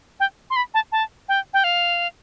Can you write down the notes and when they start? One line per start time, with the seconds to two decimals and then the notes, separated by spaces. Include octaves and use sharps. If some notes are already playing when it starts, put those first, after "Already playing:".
0.20 G5
0.50 C6
0.56 B5
0.74 A5
0.92 A5
1.29 G5
1.54 G5
1.64 F5